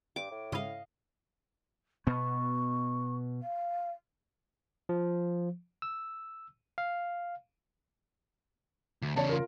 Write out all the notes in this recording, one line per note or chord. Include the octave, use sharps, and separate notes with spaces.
G2 D6
A2
G#2 C#3 E4 D#5 F5
B2 B3 C#6
F5
F3
E6
F5
D2
E2 C#3 C#5 D5 A5
F4 A#4